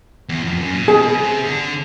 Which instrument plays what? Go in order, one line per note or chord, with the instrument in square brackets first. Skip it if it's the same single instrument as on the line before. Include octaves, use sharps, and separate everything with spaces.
[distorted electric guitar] E2
F2
F#2
A#2
[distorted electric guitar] B2 [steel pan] G#4
[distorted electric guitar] C3
D3